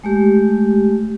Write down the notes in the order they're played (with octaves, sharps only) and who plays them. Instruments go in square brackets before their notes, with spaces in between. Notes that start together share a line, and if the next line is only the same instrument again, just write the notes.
[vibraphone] G#3 A3 G4